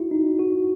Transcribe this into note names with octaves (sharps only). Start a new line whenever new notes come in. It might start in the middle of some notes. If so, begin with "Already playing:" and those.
Already playing: E4 F#4
D#4
F#4